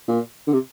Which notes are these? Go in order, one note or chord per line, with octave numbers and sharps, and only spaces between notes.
A#2
D3
C3